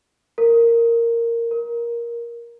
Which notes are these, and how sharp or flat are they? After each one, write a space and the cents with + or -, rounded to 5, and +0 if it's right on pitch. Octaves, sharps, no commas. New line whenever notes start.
A#4 -10
A#4 +10